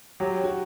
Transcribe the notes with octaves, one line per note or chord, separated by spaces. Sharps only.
F#3 G4
F#4